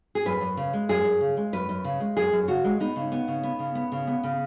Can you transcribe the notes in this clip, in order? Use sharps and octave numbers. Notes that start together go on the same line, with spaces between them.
G#4
F#2 B4
F#2
C#3
G#3
F#2 G#4
F#2
C#3
G#3
F#2 B4
F#2
C#3
G#3
F#2 G#4
F#2
C#3 F#4
G#3
B3 D#4
C#3
B3
C#3
B3
C#3
B3
C#3
B3
C#3